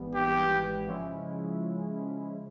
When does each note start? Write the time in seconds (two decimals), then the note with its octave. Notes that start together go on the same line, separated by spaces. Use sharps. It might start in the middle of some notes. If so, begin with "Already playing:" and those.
Already playing: G#1 G#2 E3 G3 B3
0.14 G4
0.88 C#3 F3 G#3 C#4 E4